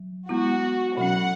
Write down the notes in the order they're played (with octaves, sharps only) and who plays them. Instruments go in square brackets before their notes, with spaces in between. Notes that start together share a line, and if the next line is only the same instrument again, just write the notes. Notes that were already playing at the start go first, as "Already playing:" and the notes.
Already playing: [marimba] F#3
[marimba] G#3 B3 E4 [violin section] F#4
[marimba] B2 F#3 C#4 [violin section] F#5